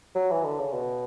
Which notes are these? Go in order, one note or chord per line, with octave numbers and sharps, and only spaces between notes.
F#3
E3
D3
C#3
B2